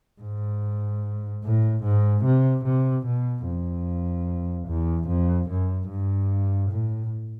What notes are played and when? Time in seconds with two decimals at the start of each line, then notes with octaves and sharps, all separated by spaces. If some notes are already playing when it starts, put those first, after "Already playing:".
0.22 G#2
1.44 A2
1.84 G#2
2.25 C3
2.65 C3
3.06 B2
3.46 F2
4.68 E2
5.08 F2
5.50 F#2
5.89 G2
6.70 A2